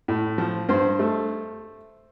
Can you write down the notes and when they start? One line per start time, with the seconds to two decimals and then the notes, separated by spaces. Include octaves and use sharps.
0.08 A2
0.38 F3
0.69 G2 C5
0.99 A3